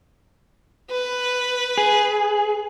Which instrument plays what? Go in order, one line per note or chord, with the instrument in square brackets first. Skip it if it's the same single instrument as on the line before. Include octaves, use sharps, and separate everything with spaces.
[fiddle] B4
[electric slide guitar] G#4